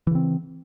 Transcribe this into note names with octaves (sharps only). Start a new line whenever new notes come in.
C#3 E3 C4